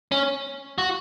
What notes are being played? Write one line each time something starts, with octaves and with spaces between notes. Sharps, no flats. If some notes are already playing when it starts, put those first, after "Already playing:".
C#4
F#4